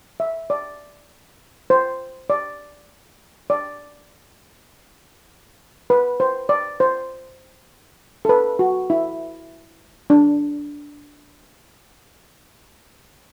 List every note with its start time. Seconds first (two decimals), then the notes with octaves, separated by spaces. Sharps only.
0.20 E5
0.50 D5
1.70 C5
2.30 D5
3.50 D5
5.90 B4
6.20 C5
6.49 D5
6.80 C5
8.25 A4
8.29 B4
8.59 F#4
8.90 E4
10.10 D4